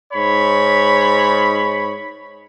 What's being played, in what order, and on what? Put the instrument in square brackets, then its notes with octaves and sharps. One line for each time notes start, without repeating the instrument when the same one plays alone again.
[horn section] G#2 C#5 B5